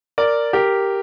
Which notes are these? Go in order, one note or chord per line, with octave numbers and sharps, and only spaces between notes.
A#4 D5
G4 A#4